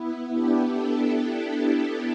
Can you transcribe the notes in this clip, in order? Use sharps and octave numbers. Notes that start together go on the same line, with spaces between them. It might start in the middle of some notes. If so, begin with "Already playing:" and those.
Already playing: B3 E4
D4 G4
E4 A4